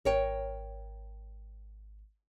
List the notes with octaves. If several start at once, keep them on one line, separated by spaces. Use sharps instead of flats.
G#1 A#4 C#5 G5